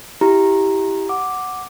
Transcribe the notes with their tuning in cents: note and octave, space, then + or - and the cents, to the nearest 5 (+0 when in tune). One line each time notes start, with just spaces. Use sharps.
E4 +0 G4 -5 A#5 +0
F#5 +0 D6 +0